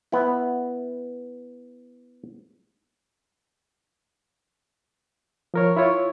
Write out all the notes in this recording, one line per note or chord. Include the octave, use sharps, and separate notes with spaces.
B3 E4
F3 A#4 C#5
E4 F4 C#5